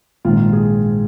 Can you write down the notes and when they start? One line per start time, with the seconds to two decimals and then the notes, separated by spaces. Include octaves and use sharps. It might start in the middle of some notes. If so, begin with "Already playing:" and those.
0.25 A#1 G#2 D#3 F4
0.53 G#4